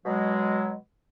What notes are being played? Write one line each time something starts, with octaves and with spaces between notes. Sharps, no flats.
B2 F#3 G#3